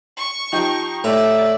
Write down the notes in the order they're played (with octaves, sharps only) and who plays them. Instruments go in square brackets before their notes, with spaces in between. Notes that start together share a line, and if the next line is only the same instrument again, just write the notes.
[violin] C#6
[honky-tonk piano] F3 D#4 G4
[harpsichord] A2 A#5 [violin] D5 [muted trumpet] E5